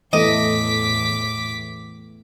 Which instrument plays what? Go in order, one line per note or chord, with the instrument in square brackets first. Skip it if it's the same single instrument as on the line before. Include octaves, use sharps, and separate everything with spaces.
[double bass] E2 A2 [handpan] E3 A3 B3 [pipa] D#5 [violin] D6 B6